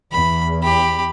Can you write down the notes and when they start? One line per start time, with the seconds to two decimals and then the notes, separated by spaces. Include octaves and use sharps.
0.12 E2 B5
0.63 G4 B5